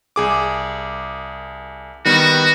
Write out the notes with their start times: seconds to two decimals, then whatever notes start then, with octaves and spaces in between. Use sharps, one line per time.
0.16 C2 G#4 D6
2.05 D#3 G3 B3 F#4